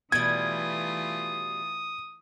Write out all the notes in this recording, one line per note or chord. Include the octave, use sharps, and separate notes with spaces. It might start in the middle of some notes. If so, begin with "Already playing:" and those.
B2 E3 G3 A3 F4 D#6 G#6